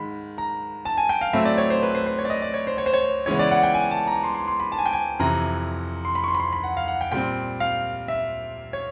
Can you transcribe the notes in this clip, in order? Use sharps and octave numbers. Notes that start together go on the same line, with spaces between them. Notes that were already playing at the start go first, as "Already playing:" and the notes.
Already playing: G#2 D#3 G#3 B5
A#5
A5
G#5
G5
F5
A2 F#3 A3 C4 E5
D5
C#5
C5
B4
C5
C5
C#5
D5
D#5
D5
C#5
C5
C#5
C5
C#5
C#3 E3 G#3 B3 C#5
D5
F#5
G5
G#5
A5
A#5
C6
C6
C6
B5
A5
G#5
G5
G#5
F2 C3 E3 A#5
C6
B5
C#6
C6
B5
C6
B5
F#5
F5
F#5
G5
A#2 G3 C4 G5
F5
E5
C#5